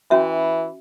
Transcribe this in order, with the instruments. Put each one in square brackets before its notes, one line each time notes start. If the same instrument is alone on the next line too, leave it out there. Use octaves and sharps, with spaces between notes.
[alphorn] E3 [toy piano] C#4 F#4 E5